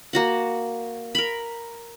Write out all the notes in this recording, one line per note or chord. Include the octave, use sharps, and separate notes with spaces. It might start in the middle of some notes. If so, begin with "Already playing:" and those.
A#3 F#4 F#5
A#4 B5